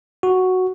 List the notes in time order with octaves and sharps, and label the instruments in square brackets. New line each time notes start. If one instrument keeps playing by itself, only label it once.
[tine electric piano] F#4